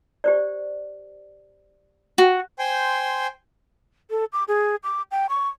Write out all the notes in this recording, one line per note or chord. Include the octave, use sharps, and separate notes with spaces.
G4 C5 D5
F#4
C5 G5 G#5 C6
A4
D6
G#4
D6
G5
C#6